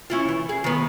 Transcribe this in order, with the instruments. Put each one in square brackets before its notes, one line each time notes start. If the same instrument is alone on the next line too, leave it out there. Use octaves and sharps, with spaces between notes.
[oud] C#4 E4 F4
E3
G#4
D#3 B3